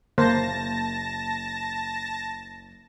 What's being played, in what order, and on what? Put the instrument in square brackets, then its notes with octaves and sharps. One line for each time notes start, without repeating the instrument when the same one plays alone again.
[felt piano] F#1 [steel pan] A#3 C5 [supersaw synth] A5 A#6